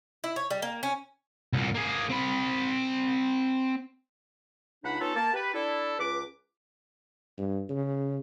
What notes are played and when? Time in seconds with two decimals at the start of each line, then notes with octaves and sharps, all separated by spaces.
0.24 E4
0.36 C#5
0.50 G3
0.62 A#3
0.83 C#4
1.53 C2 A#2
1.75 A#3 G#4
2.10 C4 B5
4.84 C#2 C#3 D4 D#4 F#5 B5
5.01 B3 C#4 D#4 F4 A4
5.16 A#3 A5
5.34 G4 B4
5.54 D4 E4 A4
5.99 C#2 B4 D6
7.38 G2
7.70 C#3